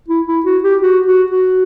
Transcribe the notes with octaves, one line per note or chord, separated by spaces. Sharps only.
E4
E4
F#4
G4
F#4
F#4
F#4